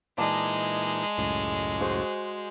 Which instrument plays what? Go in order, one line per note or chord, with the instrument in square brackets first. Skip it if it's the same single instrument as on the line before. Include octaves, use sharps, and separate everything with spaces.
[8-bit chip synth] A#2 E3 D#4 [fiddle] G#3 [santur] D5 A5 A#5
[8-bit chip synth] C#2 F#2 A2
[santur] F#4 G#4 C5